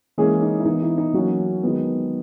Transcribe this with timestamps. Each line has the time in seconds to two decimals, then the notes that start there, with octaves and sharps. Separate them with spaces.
0.18 E3 G#3 A#3 C#4 G#4
0.42 D#4
0.60 E4
0.65 E3 B3 D#4
0.82 E4
0.98 D#4
1.14 E3 F#3 A#3 C#4 F#4
1.63 D#3 G#3 B3